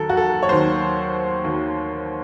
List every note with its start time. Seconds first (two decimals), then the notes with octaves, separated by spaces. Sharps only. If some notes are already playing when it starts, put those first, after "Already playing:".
Already playing: D#2 D#3 F#3 A4 A#4
0.09 F#4
0.17 A4
0.43 C#5
0.49 D#2 D#3 F#3 C5
1.44 D#2 D#3 F#3